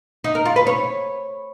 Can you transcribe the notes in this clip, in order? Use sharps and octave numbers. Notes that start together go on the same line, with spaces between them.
D#4
A#4
F4
B4
C#5